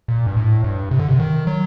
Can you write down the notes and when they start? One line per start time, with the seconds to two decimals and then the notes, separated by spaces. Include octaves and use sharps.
0.08 A#2
0.26 G2
0.37 A2
0.64 G2
0.91 C3
0.99 D3
1.08 C3
1.19 D#3
1.47 F#3